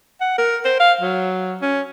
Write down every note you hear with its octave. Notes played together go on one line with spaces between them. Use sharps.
F#5
A#4
C5
F5
F#3
C#4